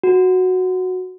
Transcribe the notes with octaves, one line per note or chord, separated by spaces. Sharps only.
F#4